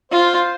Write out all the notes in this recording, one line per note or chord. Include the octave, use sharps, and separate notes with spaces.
F4 C5